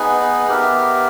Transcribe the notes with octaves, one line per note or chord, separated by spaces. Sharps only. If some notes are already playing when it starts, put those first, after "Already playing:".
Already playing: B3 D#4 G#4 B4
B3 G4 A#4 E5